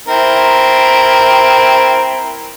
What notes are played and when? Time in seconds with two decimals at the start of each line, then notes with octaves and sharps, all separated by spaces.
0.08 C4 E4 A#4